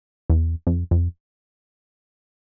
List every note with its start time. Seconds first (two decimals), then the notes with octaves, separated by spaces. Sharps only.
0.30 E2
0.67 F2
0.91 F2